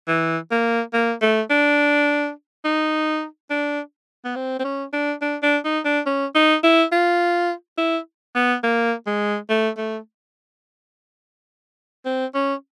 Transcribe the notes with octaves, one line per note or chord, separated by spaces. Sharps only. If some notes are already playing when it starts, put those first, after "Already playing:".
E3
A#3
A#3
A3
D4
D#4
D4
B3
C4
C4
C#4
D4
D4
D4
D#4
D4
C#4
D#4
E4
F4
E4
B3
A#3
G#3
A3
A3
C4
C#4